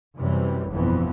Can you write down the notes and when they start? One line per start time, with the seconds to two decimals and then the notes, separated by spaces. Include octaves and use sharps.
0.17 F#2 C3 E3 G3
0.70 G1 F2 B2 E3 B3